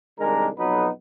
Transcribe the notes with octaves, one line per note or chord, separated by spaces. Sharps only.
C2 D#3 G#3 D4 A#4
B1 F2 F#3 B3 D#4 B4